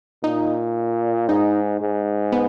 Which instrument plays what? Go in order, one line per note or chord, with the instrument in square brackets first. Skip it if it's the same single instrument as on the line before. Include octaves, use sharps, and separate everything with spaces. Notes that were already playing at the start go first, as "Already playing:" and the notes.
[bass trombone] A#2 [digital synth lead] D#4
[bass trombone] G#2 [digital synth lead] D#4
[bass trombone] G#2
[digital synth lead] B3